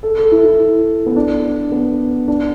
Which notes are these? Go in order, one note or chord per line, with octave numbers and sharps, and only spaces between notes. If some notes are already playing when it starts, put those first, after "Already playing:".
A4
A4
E4
E4
B3
D4
B3
D4